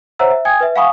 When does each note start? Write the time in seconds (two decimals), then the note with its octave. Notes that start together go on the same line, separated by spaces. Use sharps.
0.19 C5 C#5 E5 F#5 A#5 E6
0.31 E5
0.45 G5 G#5 D#6 G#6
0.60 B4 E5
0.76 F5 F#5 G#5 B5 C#6 D#6